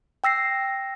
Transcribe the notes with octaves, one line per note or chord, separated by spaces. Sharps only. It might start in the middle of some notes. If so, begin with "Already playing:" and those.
G5 E6 A#6 C7